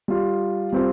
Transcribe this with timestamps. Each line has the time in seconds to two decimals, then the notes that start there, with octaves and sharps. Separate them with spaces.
0.08 G3 F4
0.73 G3 C4 F4